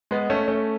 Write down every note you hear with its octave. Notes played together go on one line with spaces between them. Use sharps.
G#3 B3
A3 C#4
A3 C#4